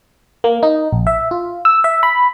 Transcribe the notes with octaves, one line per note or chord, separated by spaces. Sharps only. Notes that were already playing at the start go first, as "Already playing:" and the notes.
A#3
D#4
A#1
E5
F4
E6
E5
B5